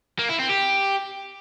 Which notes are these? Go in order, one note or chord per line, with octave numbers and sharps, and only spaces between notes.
A#3
E4
C4
G4